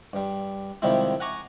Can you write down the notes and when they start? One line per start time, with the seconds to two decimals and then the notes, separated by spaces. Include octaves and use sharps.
0.13 G2 G3
0.82 C3 D#3 F3 G3 G#3 E4
1.20 F#5 G#5 A#5 C#6 D6